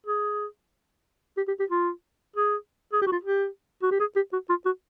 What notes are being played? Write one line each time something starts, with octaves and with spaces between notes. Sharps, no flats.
G#4
G4
G4
G4
F4
G#4
G#4
G4
F#4
F4
G4
F#4
G4
G#4
G4
F#4
F4
F#4